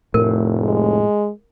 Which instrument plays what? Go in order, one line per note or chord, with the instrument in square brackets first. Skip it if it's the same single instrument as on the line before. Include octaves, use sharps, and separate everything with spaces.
[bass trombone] F1 [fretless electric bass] A2 [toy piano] A#4
[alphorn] G#3